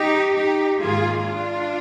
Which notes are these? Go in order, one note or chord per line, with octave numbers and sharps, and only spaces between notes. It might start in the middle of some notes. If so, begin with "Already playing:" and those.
Already playing: D#4 G4
D#4 G4
G#2 D#3 A#3 F4 G#4
D4 F4